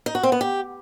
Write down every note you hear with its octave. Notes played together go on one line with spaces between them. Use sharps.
D#4
F#4
C4
B3
G4